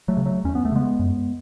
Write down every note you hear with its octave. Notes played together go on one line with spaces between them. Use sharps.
F#3 A3
C#3
F#3 A3
E2 C#4
B3
A3
C#3 G#3 B3
F#2